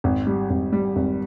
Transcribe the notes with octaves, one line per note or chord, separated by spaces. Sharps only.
G#1
G3
G#1
G3
G#1